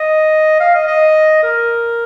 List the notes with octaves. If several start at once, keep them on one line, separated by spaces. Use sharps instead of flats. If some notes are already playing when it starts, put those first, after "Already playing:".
Already playing: D#5
F5
D#5
D#5
A#4